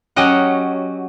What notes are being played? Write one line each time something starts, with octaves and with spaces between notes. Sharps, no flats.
F#3 C#4 G4 D#5 F#5